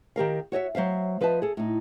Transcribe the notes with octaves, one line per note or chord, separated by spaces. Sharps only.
D#3 G4 A#4 F5
F#4 C#5 D#5 E5
F#3 C5 E5 F5
F3 B4 D#5 E5 A5
G#4 A4
A2 D#4